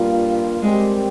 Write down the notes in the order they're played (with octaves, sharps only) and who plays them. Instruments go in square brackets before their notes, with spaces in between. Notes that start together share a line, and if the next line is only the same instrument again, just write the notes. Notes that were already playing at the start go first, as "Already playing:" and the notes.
Already playing: [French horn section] G2 G3 A#3 F4
[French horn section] G3 C4 G4 A#4 [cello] G#3